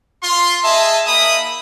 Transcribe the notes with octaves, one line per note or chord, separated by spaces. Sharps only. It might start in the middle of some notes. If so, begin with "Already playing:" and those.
F4 C6
G#4 D#5 E5 A5
A#3 D#4 E5 B5 D#6